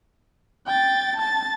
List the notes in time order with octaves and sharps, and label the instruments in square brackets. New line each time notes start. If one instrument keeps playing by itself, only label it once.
[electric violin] G5 A6
A5 A6